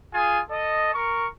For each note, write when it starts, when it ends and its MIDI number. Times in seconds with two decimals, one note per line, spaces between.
0.13 0.39 65
0.13 0.39 68
0.13 0.39 80
0.50 0.90 69
0.50 0.90 75
0.94 1.26 70
0.94 1.26 85